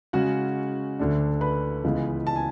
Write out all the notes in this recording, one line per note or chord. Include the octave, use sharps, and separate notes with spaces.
C#3 G#3 C#4 F#4 F#5
D2 D3 A3 D4
B4 B5
C#2 C#3 E3 G#3 B3
A5
G#5